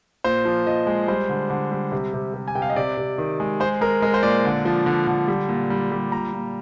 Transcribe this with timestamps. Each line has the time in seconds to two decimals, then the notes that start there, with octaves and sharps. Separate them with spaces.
0.24 A#2 C5
0.45 F3
0.67 F3 D#5
0.87 G#3
1.08 G3 C5
1.29 D3
1.50 D3
1.72 G3
1.92 C3
2.14 C3
2.34 C3
2.48 G#5
2.55 C3 G5
2.62 F5
2.70 D#5
2.76 C3 D5
2.97 C3
3.18 D#3
3.40 G#3
3.60 G#3 C5
3.81 G#3 A#4
4.02 G#3 A#4
4.14 C5
4.23 A#2 D5
4.45 D3
4.65 F3
4.86 D3
5.07 D3
5.28 G3
5.49 A#2
5.70 G3
5.92 G3
6.12 A#2 A#5
6.33 A#2